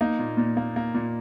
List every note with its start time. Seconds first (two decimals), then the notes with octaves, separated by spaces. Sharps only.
0.01 A#3 D#4
0.19 A#2
0.37 A#2
0.57 A#3
0.76 A#3
0.95 A#2